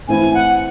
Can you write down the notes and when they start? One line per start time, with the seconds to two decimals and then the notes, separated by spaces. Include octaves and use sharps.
0.08 A2 E3 C4 E4 G#5
0.34 F#5